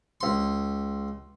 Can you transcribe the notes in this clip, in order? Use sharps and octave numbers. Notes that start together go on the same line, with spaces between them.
C#2 C6